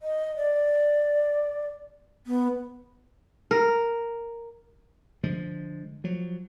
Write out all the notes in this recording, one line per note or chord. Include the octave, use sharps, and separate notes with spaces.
D#5
D5
B3
A#4
D3 F3 G#3
F3 F#3